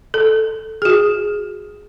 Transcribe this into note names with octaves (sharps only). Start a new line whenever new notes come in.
A4
F#4 G#4